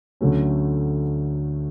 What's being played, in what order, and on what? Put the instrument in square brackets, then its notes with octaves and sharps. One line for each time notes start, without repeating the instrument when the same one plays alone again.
[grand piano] D2 D3 F#3 A3 C#4